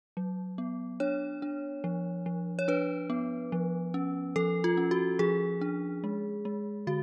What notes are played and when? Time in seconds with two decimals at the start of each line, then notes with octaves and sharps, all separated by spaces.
0.17 F#3
0.58 B3
1.00 D4 C#5
1.42 D4
1.84 F3
2.26 F3
2.59 C#5
2.68 D4 B4
3.10 B3
3.52 F3
3.94 C#4
4.36 F3 A4
4.64 F4
4.77 C#4
4.91 F#4
5.19 F3 G#4
5.61 D4
6.04 G#3
6.45 G#3
6.87 D3 F#4